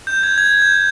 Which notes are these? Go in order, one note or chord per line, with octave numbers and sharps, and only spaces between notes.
G6
G#6
G#6
G6